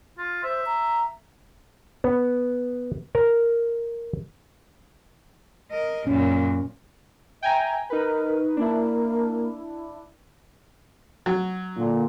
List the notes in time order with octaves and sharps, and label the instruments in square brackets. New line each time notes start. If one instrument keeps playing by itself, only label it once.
[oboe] F4
[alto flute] C5 [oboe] E5
[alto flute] A#5
[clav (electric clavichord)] B3
A#4
[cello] A#4 D#5
[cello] F#2 A#2 [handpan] C#4
[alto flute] E5 [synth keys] G5 G#5 A#5
[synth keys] D#4 B4 [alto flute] A#4
[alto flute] A#3 [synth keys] D4 E4
[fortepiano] F#3
[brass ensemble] A#2 D3